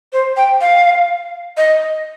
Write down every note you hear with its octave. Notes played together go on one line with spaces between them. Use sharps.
C5
G5
F5
D#5